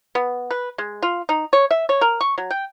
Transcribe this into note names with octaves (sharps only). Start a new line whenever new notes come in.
B3
B4
G#3
F4
D#4
C#5
E5
C#5
A#4
C#6
F#3
G5